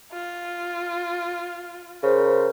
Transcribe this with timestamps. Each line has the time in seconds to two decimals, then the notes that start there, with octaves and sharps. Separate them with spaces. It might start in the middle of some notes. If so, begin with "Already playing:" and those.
0.12 F4
2.03 C#3 A#4 C5